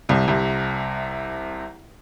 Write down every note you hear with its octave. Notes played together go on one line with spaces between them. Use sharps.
C2 C3
C2 C3